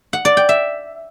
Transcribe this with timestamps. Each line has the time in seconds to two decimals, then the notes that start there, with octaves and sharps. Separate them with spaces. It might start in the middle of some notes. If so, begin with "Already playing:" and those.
0.13 F#5
0.25 D5
0.37 G5
0.49 E5